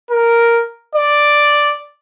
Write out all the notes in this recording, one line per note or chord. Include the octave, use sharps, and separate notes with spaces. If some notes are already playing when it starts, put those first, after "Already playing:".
A#4
D5